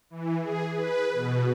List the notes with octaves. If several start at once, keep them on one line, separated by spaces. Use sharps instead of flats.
E3
G#4
B4
B2